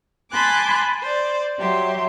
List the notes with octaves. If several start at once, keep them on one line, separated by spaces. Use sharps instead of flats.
G#5 A5 B5 C6 D6 F#6
C5 D5
F#3 G4 E5 C6